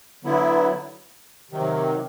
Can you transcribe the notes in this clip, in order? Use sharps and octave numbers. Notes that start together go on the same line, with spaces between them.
D3 F#3 B3 E4
C3 D#3 F#3